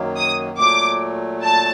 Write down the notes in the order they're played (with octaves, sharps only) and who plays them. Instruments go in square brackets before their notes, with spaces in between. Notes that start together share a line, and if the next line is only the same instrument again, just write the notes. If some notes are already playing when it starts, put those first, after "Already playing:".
Already playing: [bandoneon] F#2 D#3 F#3 A#3
[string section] D#6
[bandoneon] A#2 F#3 A3 [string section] D6
[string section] A5